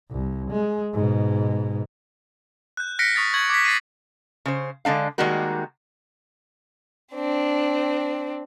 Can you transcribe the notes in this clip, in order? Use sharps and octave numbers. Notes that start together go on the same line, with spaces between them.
C2
G#3
G#2 B2
F#6 G6
F6 F#6 A#6 B6 C#7 D7
C#6 D#6 A6 B6
C#6 G#6 F#7
D6 G#6 B6
A6 C7 D#7
C#3 C5
D3 G#3 D4 F5
D#3 G3 G#3 A#3 F#4 A#4
C4 D4